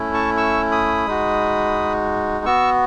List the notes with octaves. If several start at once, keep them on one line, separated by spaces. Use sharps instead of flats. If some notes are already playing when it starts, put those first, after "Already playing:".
Already playing: A3 C#4 E4
A5 C#6
C#6 E6
B5 D#6
G#3 D#4 F#4
B3 F#4 C#6 E6